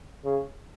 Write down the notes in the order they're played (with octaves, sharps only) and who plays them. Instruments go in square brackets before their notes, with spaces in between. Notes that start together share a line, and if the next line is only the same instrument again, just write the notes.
[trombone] C#3